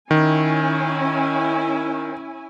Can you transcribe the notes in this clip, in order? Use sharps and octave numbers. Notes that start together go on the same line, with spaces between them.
D#3 C#4 E4 G#5